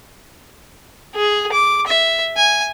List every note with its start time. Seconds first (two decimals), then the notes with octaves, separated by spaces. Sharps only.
1.15 G#4
1.52 D6
1.87 E5
2.37 G#5